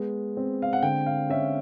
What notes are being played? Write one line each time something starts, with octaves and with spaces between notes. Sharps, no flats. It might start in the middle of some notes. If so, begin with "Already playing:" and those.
Already playing: G#3 B3
C4
F5
F#5
D3 G5
F5
C#4 E5